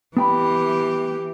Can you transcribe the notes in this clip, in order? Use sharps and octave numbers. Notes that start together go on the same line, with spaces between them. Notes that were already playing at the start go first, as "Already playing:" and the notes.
E3 B3 G4 G5 B5